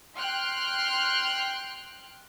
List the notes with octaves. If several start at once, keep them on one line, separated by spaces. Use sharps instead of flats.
G5 C6 F6 F#6